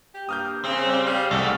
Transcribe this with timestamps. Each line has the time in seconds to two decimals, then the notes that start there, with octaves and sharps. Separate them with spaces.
0.14 G4
0.29 G2 A#3 D#6 F6 G6
0.64 C#3 C4
0.86 G3
1.06 G3 F5
1.31 C2 G#2 A3